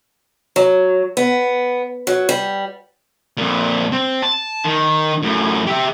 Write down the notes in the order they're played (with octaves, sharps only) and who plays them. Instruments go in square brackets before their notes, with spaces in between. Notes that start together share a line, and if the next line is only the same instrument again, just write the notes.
[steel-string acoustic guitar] F#3
B3
F#3
G3
[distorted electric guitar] F2 A#2
C4
A5
D#3
F#2 A2
G4 E5